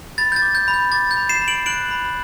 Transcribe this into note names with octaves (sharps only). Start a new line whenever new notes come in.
B5 A6
G6
A6
D6
G6
B5
G6
D6 A6
G6
B5
C7 E7
B5
D7 F#7
F#6 D7 F#7
B5